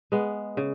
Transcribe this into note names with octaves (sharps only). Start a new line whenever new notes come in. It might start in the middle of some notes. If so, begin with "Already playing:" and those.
G#3 B3
C#3